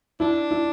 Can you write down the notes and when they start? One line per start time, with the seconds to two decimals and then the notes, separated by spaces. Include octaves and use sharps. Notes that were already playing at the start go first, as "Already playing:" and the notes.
0.20 D4 E4
0.51 E4